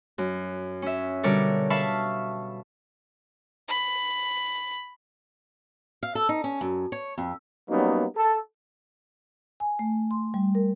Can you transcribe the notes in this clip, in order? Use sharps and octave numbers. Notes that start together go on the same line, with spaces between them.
F#2
C#4 E5
B2 D3 G3 A#4 C#5 D5
E5 F5 A5 B5 C#6 F6
B5
F5
A4
D#4
C#4
F#2
C#5
F2
F#3 G3 A#3 B3 C#4 D#4
A4
G#5
A3
C6
G3
A#4